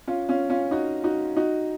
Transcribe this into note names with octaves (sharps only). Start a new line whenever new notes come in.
C#4 F4
C#4 F4
C#4 F4
D#4 F#4
D#4 F#4
D#4 F#4